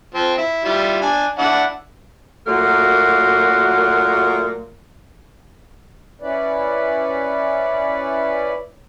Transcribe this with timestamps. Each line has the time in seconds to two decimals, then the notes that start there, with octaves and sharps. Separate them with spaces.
0.14 F3 C4
0.38 E4
0.65 G3 E4 F4
1.02 D4 G#5
1.38 D4 E4 F#5
2.47 A#2 F#3 A3 A#3 F#4 A#4
6.21 C#4 E4 B4 D5